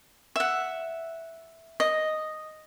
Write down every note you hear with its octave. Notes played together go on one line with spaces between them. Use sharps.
E5 F#5
D#5